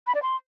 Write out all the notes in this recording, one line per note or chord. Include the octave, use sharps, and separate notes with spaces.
B5
D5
C6